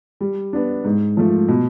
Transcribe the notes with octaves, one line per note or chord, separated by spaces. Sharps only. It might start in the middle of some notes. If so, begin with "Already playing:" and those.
G3
B3 D4
G#2
F3 A3
B2